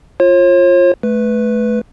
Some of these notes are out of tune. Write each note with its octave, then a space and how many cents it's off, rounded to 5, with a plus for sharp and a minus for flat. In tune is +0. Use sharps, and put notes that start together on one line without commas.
F4 +0 C#5 -45
A3 -20 B4 +0